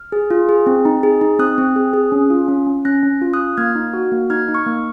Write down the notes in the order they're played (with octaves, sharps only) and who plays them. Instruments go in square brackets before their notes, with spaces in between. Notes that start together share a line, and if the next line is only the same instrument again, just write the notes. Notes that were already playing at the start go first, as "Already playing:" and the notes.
Already playing: [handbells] F6
G#4
F4
G#4
C4
D#4
G#4
D#4
C4 D#6 F#6
C4
G#4
G#4
C#4
F4
C#4
C#4
C#4 F#6 A#6
C#4
F4
D#6 F#6
F4
A#3 F6 G#6
D#4
F#4
A#3
D#4 F6 G#6
D#4
C#6 F6
A#3